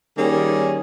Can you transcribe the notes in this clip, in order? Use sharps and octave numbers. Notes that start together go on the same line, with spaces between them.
D#3 G3 A#3 C#4 G#4